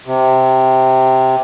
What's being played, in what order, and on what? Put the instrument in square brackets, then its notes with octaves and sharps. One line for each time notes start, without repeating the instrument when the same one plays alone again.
[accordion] C3